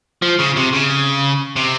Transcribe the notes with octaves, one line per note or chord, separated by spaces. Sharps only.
F3
C#3
C3
C#3
C3